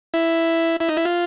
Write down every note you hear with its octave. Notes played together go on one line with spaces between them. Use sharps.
E4
E4
D#4
E4
F4